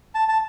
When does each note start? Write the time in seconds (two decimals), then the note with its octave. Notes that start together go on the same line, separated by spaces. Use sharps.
0.15 A5
0.29 A5